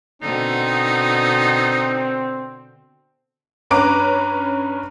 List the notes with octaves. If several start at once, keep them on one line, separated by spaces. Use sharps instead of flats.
B2 D3 C4 D#4
G2 C#4 B4 A#5 D6 D7